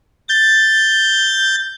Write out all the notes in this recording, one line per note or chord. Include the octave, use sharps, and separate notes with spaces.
G6 A6